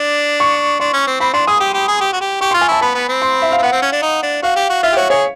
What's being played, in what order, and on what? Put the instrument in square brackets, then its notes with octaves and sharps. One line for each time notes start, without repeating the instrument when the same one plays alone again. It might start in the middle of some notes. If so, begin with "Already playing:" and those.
Already playing: [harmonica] D4 [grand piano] D6
[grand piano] C#6
[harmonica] D4 [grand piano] C6
[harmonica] C#4
C4
[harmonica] C4 [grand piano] B5
[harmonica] D4 [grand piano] C6
[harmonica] G#4 [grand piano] D#6
[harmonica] G4
G4
G#4
G4
F#4
G4
[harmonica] G4 [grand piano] C#6
[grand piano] C6
[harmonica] F4
[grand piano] G#5
[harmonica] E4 [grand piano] A5
[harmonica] B3 [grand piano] B5
[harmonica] B3
C4
[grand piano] C6
E5
F5
[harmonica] C4
[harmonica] B3 [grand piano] F#5
[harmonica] C4
C#4
D4
D#4
D4
[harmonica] F#4 [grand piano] F5
[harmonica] G4
F#4
[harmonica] F4 [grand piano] E5
[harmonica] G4
[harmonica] F#4 [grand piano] C#5
[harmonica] G#4 [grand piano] C#5